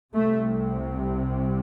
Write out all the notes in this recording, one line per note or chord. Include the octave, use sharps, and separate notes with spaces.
C2 C3 A3